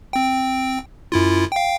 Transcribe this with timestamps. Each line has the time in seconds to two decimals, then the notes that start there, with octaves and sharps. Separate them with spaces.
0.13 C4 G5
1.12 F#2 E4 F4
1.52 F5 G5